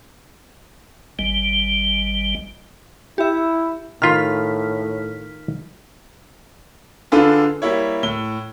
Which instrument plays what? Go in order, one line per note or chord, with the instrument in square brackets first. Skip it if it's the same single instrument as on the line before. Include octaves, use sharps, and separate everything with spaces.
[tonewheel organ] G#1 G3
[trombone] E4 [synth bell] G4 E5
[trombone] A2 [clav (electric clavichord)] D#3 F4 B4 [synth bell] F6 B6
[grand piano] D3 D4 F4 G#4 A4 B4
G3 A#3 E4 C#5
A2 G7